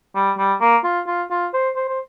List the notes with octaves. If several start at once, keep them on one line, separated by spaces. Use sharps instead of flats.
G3
G3
A#3
F4
F4
F4
C5
C5
C5